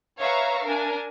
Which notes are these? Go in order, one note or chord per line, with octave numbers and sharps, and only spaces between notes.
B4 C#5 E5 F5 A#5 C#6
D4 A#4 G#5